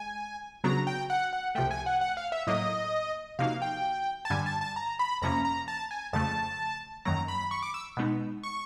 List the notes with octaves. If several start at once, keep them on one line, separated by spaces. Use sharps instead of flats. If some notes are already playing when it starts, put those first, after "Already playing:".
Already playing: G#3 G#5
C#3 F#3 B3 D4 F#4 A#5
G5
F#5
F#5
C2 C3 F3 A3 G5
G#5
F#5
F#5
F5
E5
A2 F#3 A#3 D#5
C3 F3 A#3 D#4 F#4 F5
G5
A5
G2 D3 G3 G#5
A5
A5
A#5
B5
F2 C3 F3 A#3 C#4 A#5
A#5
A5
G#5
F2 C#3 F3 A3 A5
F#2 D#3 F#3 A#3 A#5
B5
C#6
D6
E6
B2 G#3 B3 D#4
C#6